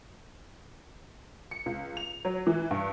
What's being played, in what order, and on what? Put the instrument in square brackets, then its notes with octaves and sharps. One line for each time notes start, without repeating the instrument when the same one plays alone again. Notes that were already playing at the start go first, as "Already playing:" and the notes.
[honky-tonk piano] C#7
C#2
F7
F#3
E3
G2